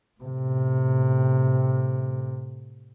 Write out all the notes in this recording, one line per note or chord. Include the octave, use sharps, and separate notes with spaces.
A2 C3